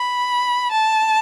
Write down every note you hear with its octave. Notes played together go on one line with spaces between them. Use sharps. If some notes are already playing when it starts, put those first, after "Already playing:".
Already playing: B5
A5